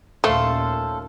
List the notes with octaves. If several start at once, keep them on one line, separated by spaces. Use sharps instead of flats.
D#2 A#2 A3 C#4 F4 A4 C5